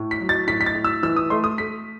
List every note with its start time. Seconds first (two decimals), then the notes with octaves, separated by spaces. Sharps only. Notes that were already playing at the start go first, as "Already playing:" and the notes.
Already playing: A2
0.11 B6
0.20 F#3
0.29 A6
0.47 A2 B6
0.61 B6
0.66 A6
0.75 A2
0.84 E6
1.03 E3 E6
1.16 D#6
1.30 A3 C6
1.44 D#6
1.58 A3 B6